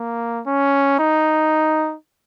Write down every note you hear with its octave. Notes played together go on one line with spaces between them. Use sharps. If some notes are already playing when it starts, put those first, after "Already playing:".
Already playing: A#3
C#4
D#4